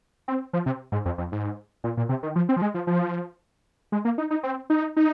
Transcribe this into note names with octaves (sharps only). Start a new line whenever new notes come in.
C4
F3
C3
G#2
F2
F2
G#2
A#2
A#2
C3
D#3
F3
C4
F3
G#3
F3
F3
G#3
A#3
D#4
D#4
C4
D#4
D#4